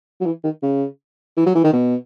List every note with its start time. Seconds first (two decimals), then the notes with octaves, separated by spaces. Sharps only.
0.21 F#3
0.25 E3
0.44 D#3
0.63 C#3
1.37 E3
1.46 F#3
1.55 E3
1.64 D#3
1.73 B2